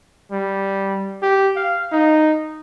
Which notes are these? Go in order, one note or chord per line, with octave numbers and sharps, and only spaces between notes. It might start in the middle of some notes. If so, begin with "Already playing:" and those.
G3
G4
F5
D#4